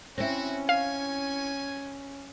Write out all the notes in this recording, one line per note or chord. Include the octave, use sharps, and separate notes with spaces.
C4 C#4 E4 F#4
C#5 F5 G#5